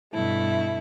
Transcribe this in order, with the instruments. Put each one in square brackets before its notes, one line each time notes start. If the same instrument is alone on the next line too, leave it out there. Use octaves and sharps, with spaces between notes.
[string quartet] G2 B2 A3 E4